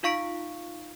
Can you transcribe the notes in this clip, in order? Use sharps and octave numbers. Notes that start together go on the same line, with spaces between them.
D#4 F4 F5 C#6 B6 D7